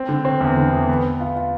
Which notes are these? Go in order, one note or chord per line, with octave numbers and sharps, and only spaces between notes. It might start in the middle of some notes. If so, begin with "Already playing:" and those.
Already playing: C4
D3
C4
E2
D3
E2
B3
B3
F4
F4